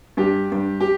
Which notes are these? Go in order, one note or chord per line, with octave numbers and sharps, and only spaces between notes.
G2 G4
G2
G4